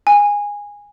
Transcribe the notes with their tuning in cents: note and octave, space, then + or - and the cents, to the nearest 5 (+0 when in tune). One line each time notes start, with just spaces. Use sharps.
G#5 -15